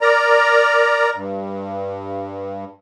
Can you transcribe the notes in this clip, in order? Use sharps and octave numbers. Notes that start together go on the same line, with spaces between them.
A#4 D5 A#5
G2